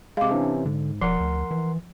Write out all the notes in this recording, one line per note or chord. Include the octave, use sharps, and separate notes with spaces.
C3 G#3 F5 D6
C3 E3 C#4 D4
G#2 D3
E1 F3 A#4 F#5 C6
D2
E3